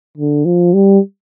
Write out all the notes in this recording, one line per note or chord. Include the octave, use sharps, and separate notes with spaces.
D3
F3
G3